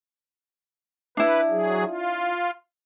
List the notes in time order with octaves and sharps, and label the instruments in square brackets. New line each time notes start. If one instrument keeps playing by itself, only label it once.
[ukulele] D4 E4 [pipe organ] B4
[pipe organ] F#3 G#4
F4